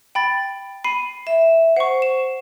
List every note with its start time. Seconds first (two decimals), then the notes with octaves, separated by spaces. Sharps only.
0.15 G5 B5 A6
0.84 B5 C7 D#7
1.27 E5
1.77 C5 F#5 C#6
2.02 E7